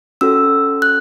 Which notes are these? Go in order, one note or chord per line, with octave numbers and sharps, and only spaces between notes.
C#4 F#4 A4 E6
F#6